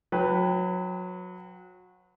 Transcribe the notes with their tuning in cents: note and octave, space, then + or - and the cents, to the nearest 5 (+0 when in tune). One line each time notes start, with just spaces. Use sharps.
F#3 -25 B4 +0 G5 +0